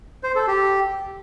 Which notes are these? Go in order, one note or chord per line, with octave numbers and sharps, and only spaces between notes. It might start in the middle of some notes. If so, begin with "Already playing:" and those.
C5
A4
G4